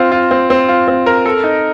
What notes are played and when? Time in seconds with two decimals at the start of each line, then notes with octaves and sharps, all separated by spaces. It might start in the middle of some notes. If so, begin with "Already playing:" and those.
Already playing: C4 F4
0.12 F4
0.31 C4
0.50 C4
0.69 F4
0.88 C4
1.06 A#4
1.26 A4
1.44 D#4